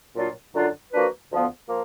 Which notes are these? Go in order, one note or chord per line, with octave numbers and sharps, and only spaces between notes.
A#2 F#3 D4 F4
F#2 D3 F#3 D4 F4
F3 A#3 D4 F#4 B4
D2 D3 F3 B3 F4
F3 A#3